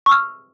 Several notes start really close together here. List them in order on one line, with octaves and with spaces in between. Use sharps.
C#6 E6 F6